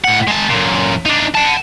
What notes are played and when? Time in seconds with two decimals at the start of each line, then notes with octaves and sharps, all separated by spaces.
0.04 A2 F#5
0.27 G#3 A5
0.49 F#2 A#2
1.06 D4 D#4
1.35 F#5 A5